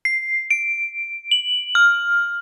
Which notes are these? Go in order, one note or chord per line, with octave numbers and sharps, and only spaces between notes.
C7
D7
F#7
F6